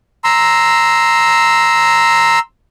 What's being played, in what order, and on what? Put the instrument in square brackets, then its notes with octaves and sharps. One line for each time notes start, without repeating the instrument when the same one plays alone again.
[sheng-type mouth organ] A#5 C6 E6